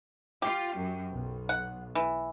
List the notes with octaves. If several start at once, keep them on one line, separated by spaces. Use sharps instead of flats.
F4 G4
F#2
B1
F#5
E3